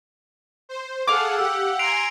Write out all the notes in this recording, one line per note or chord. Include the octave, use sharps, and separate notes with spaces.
C5
G#4 A4 F5 F#5 D6
G4 F#5 E6
G#5 A#5 C6 C7 D7 F7